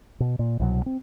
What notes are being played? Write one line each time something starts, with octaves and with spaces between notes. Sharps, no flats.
B2
A#2
C2 B2 D3 F#3
C4